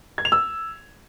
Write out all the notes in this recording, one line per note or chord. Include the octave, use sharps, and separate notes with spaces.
G#6
F7
E6